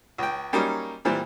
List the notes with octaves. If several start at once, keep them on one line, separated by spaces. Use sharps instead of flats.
C#2 G5
F#3 G3 A#3 C#4 D#4
A#2 E3 G3 C4